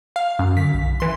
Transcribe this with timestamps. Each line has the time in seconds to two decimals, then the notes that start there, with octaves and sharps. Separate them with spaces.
0.16 F5
0.39 F#2
0.57 D3 B6
0.74 B1
1.00 E3 C6